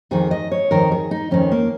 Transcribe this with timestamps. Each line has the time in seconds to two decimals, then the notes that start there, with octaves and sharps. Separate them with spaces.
0.11 F2 D#3 G#4
0.31 D#5
0.52 C#5
0.71 F2 D#3 A#4
0.92 G#4
1.11 D#4
1.31 F2 D#3 C#4
1.52 A#3